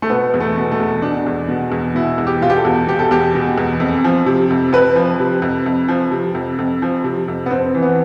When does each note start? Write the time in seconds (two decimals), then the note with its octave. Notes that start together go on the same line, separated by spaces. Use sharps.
0.02 A3
0.10 B2 B3
0.34 E2
0.40 A3
0.57 B2
0.72 A3
0.80 E2
1.02 B2 D4
1.27 E2
1.48 B2
1.72 E2
1.95 B2 E4
2.18 E2
2.27 G4
2.42 B2 F4
2.50 G4
2.57 A4
2.65 E2
2.87 B2 G4
2.99 A4
3.11 E2 G4
3.35 B2
3.58 E2
3.80 F2
4.04 F3
4.26 C3
4.51 F2
4.73 F2 B4
4.96 F3
5.20 C3
5.42 F2
5.66 F2
5.88 F3
6.11 C3
6.35 F2
6.59 F2
6.82 F3
7.04 C3
7.28 F2
7.46 B3
7.51 F2 C4
7.75 E3
7.82 B3